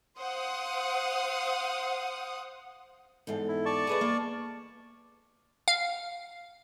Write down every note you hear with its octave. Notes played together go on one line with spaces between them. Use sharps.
C5 F5 F#5 D#6
E2 G#2 A4
E4
D5 A5 C#6
G#4 B4 D#5
A#3
F5